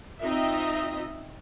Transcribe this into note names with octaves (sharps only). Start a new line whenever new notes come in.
C4 D#4 F4 D#5 E5